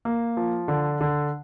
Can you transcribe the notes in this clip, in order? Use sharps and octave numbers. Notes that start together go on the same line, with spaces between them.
A#3
F3
D3
D3